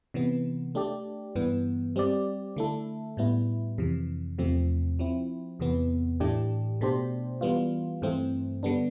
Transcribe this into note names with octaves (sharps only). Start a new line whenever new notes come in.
C3 E3 B3
A3 D4 G4 D5
G2 E3 B3
G3 C4 G4 D5
D3 A3 E4 A4
A2 G3 B3 E4
F2 C3 E3
E2 C3 F3 A3 C4
F3 C4 E4
E2 C3 E3 B3
A2 E3 A3 D4 G4
B2 A3 D4 G4 C5
E3 G3 B3 F4
G2 E3 A3 C4
D3 G3 B3 D4